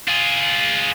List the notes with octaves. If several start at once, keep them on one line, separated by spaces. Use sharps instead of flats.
F4 G#4